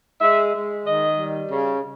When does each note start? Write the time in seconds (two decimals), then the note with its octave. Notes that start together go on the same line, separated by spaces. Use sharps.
0.21 G#3 E5
0.52 G#3
0.84 D#3 D#5
1.17 G3
1.50 C#3